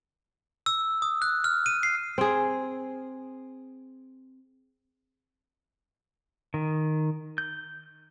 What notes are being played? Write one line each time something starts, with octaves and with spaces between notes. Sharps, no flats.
E6
D#6
F#6
F6
D#7
C7
C4 G#4
D#3
G6